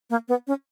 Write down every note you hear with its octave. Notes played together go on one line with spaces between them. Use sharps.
A#3
B3
C#4